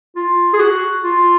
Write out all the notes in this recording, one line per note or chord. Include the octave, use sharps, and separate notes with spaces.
F4
G#4
F#4
F4